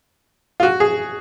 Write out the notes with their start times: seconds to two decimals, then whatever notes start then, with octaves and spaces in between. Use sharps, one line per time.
0.60 F4
0.63 F#4
0.80 G#4